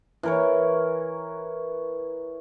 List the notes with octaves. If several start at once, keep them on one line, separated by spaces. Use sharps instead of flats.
E3 A#4 C#5